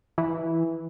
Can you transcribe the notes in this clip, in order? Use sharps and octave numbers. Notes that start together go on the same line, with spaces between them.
E3